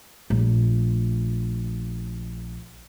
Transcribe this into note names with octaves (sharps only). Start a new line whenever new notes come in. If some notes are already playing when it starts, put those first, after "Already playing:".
A#1 A3